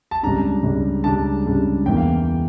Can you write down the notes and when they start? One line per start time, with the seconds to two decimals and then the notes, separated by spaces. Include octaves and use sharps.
0.11 A5
0.23 C#2 C#3 G3 D4 A#5
0.63 C#2 C#3 G3 D4
1.04 C#2 C#3 G3 D4 A5
1.46 C#2 C#3 G3 D4
1.86 E2 E3 A#3 G5
1.97 F5